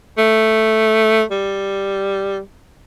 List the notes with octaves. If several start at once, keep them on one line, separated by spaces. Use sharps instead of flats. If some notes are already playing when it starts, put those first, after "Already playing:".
A3
G3